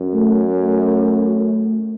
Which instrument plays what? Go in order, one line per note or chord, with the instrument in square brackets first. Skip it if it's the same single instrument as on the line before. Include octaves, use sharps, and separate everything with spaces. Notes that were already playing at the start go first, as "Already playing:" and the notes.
Already playing: [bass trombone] F#2
[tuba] A3
A3